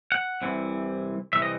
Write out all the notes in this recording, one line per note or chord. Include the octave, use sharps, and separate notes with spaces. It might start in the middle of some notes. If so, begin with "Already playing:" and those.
F#5
C2 C3 E3
C2 C3 E3 E5
D#5